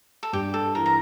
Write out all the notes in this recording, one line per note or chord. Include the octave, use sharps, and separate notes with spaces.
A4
G2 G4
A4
E3 A#4
A#5